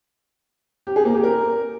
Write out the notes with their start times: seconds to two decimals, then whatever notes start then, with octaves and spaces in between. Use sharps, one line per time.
0.87 G4
0.96 G#4
1.05 A#3
1.14 G4
1.24 A#4